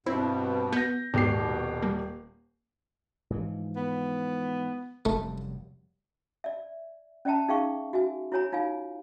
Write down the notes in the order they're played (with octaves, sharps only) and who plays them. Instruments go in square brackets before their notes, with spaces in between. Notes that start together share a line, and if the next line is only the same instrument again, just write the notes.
[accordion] G2 B2 [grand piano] C4 [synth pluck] E4
[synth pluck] B3 [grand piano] G6 A#6
[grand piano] D#1 G4 C7 [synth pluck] G#2 B3 [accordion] B2
[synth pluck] G3 A#3
[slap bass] G#2 E3 F3
[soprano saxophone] B3
[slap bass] F1 F#2 G3 [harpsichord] A3
[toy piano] D5 E5
C#4 D5 E5 G5 A5 A#5
D#4 G#4 E5 F5 G5 C#6
F#4 E5 G#5
E4 F#4 C#5 G#5 A#5
D#4 F4 F5 G#5